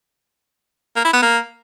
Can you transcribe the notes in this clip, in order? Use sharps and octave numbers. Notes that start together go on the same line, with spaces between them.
A#3
E4
B3
A#3